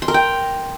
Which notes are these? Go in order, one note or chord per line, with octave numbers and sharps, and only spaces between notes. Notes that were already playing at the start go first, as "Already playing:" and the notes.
C6
A#4
G5